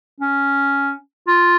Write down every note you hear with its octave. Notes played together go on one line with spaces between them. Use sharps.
C#4
F4